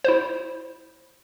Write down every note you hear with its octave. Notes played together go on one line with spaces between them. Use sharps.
E4 C5